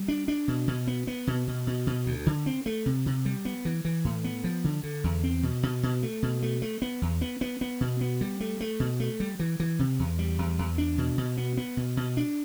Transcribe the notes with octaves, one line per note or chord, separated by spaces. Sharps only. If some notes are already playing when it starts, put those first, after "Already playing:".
Already playing: G3
D4
D4
B2
B2
B3
B3
B2
B2
B2
B2
D2
D3
C4
A3
C3
C3
G3
B3
E3
E3
A2
B3
F3
D3
D3
E2
C4
B2
B2
B2
A3
B2
A3
A3
B3
E2
B3
B3
B3
B2
B3
G3
A3
A3
B2
A3
G3
E3
E3
C3
E2
G3
E2
E2
D4
B2
B2
B3
B3
B2
B2
D4